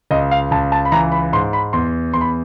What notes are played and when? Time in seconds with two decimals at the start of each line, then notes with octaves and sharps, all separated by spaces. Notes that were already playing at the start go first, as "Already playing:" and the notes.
0.11 C#2 D#5
0.31 F5
0.51 C#2 A5
0.72 A5
0.85 B5
0.92 E3 A#5
1.12 B5
1.33 G#2 C6
1.53 B5
1.73 E2 C6
2.14 E2 C6
2.21 B5